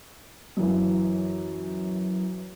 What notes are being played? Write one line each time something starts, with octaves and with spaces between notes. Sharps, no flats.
F#2 E3